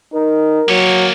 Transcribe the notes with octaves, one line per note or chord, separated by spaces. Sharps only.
D#4 A#4
F#3 A#3 C#5